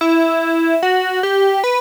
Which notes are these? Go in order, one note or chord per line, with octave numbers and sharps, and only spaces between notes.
E4
F#4
G4
B4